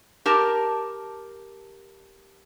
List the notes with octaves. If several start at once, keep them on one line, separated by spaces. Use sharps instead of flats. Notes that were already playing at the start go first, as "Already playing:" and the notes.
G4 A#4 A5